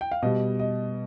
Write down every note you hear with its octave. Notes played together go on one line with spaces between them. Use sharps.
G5
F5
B2 G3 D#5
D#5